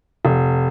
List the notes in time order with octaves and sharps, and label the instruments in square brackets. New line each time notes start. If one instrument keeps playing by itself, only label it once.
[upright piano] F1